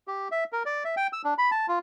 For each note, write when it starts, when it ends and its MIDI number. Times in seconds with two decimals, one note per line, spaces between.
0.08 0.28 67
0.31 0.44 76
0.52 0.63 70
0.65 0.84 74
0.85 0.95 76
0.97 1.07 79
1.13 1.22 88
1.24 1.34 62
1.38 1.51 83
1.51 1.66 81
1.68 1.79 65